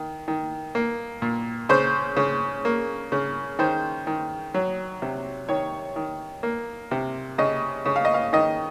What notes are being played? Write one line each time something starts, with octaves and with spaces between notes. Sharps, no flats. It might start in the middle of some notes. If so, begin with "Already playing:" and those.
Already playing: D#3
D#3
A#3
A#2
C#3 C5
C#3
A#3
C#3
D#3 C5
D#3
F#3
C3
D#3 C#5
D#3
A#3
C3
C#3 D#5
C#3
F5
D#5
F5
D#3 D#5